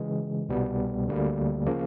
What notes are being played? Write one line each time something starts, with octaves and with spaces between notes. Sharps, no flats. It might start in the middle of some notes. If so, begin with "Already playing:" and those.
Already playing: C#3 E3 G#3
C2 B2 G3 B3
D2 D3 G3 A#3
C#3 F3 A#3